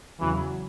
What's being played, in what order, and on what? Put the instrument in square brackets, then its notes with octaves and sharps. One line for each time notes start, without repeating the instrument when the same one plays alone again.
[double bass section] E2 C#3 F#3 [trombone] E3